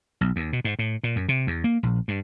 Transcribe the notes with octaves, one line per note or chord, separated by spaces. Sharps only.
B1
D#2
B2
G#2
A2
A#2
F#2
C3
E2
A#3
A#1
G2